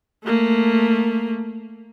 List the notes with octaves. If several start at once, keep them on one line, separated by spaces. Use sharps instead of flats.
A3 A#3